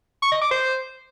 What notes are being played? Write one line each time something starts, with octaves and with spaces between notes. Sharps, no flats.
C#6
D#5
D6
C5